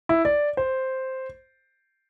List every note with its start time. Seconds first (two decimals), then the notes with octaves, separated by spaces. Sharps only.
0.09 E4
0.25 D5
0.57 C5